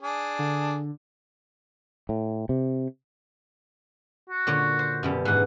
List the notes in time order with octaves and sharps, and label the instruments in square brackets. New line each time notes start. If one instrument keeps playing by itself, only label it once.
[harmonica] D4 G#4
[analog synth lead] D3
[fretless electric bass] A2
C3
[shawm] F#4
[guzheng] A#2 D3 C#5
C5
F#2 B2 G3
[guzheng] G#2 E3 [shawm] F#5